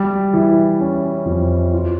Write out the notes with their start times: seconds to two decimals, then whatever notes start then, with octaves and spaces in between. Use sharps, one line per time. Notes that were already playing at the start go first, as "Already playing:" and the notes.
Already playing: G3
0.33 E3
0.80 C#4
1.25 F2
1.73 F4